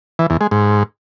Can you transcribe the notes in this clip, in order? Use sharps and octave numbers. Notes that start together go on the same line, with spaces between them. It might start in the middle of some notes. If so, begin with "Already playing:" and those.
E3
E2
G#3
G#2